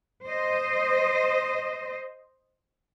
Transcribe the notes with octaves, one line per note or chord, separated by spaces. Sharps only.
C5 D#5